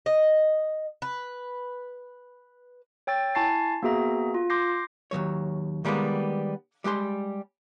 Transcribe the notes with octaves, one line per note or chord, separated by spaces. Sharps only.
D#5
B4
C#5 G5 E6 A6
E4 G#5 A5 C#6 A6 C7
A#3 B3 F#4 G#4 E5 A#5
F4
C6 D6 G6 A#6 C7
D#2 B2 F#3 C#5
D#3 G3 G#3 A#3 B3
G3 G#3 G4 C6